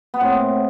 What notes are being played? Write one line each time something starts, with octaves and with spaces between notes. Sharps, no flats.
B3
A2 C4